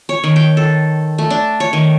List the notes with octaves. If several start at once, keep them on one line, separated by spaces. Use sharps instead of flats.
C#5
D#3
G5
A4
A3
D4
C#5
D#3